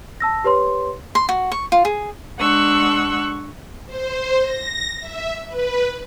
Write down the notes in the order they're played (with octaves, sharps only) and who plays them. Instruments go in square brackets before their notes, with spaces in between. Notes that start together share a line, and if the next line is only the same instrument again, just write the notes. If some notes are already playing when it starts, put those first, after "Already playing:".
[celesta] A5 E6 A#6
G4 B4 C#5 C6
[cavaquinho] C6
F#4
C#6
F4
G#4
[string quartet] G#3 D4 F#5 C#6 E6 F#6
[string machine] C5
A#6
E5
B4